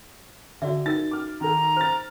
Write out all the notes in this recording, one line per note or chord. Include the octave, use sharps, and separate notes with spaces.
D3 F#4 D5 E5
D#4 A#4 A6
D6 F6
D#3 A4 A#5
C5 F6 A6